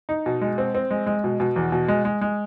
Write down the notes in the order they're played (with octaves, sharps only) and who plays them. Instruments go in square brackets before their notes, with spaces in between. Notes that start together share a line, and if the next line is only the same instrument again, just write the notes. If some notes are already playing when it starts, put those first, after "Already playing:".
[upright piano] D#4
B2
G#3
C4
C4
G#3
G#3
B2
B2
E2
B2
G#3
G#3
G#3